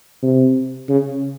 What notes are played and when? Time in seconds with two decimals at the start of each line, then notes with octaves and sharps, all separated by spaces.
0.23 C3
0.89 C#3